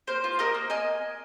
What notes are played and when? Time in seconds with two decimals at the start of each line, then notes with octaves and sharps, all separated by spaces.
0.07 A#3 C5
0.24 F4
0.39 A#3 A#4 D#5
0.54 A#3
0.70 A#3 D#5 G#5